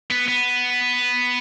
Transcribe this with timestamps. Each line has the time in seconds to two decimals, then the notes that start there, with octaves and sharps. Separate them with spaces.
0.10 B3
0.28 B3